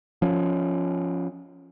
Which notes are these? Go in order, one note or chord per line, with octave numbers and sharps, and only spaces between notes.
F3 C#4